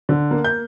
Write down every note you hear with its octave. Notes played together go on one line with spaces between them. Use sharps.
D3
A#3
G6